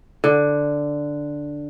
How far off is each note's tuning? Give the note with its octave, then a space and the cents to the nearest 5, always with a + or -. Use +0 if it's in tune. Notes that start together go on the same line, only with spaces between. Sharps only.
D3 +0